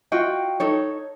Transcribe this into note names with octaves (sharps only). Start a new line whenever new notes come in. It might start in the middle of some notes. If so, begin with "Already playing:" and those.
F4 F#4 D#5 G5
D#4 A4 C#5